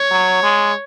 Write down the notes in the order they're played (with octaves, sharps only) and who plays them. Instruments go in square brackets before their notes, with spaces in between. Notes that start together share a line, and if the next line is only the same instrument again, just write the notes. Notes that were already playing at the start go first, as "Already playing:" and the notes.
Already playing: [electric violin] C#5
[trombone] F#3
G#3